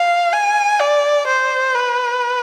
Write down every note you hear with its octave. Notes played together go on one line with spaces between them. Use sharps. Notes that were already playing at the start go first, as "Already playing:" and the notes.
Already playing: F5
G#5
D5
C5
B4